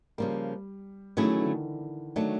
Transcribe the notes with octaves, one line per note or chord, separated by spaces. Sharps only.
C#3 F3 G3 A#3
D#3 F#3 A3 C#4 E4 G#4
E3
D#3
D3
D#3 F#3 A3 D4